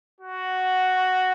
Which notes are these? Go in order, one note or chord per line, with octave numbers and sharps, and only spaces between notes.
F#4